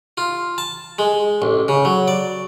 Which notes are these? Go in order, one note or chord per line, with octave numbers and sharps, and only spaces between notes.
F4
A5
G#3
A1
C#3
F#3
D5